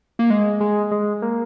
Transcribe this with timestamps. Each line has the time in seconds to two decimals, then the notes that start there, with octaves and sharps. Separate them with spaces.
0.19 A#3
0.30 G#3
0.60 G#3
0.91 G#3
1.22 A#3